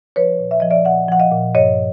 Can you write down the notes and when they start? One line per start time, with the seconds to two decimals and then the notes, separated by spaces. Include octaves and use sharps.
0.16 F3 B4 C#5
0.39 A#2
0.51 E5
0.60 F3 D#5
0.70 D5 E5
0.85 A#2 E5 F#5
1.09 F3 F#5
1.20 D#5 F5
1.31 A#2
1.55 G2 C#5 D#5